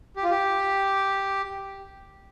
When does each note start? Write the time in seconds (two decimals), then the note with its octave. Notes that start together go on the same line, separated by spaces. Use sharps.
0.16 G4
0.23 F4
0.30 G4